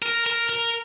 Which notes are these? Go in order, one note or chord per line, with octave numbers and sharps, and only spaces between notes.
A#4
A#4
A#4